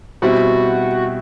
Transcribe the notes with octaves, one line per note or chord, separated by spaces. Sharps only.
B2 G3 C4 E4 F#4